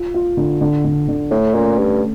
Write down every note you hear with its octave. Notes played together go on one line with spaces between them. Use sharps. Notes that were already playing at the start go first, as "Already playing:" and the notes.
Already playing: F4
F4
D3
D3
D3
D3
A2 A3
A#2 C#4
G2 C#4